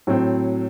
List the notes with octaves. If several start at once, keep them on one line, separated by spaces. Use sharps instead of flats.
A2 F#3 C4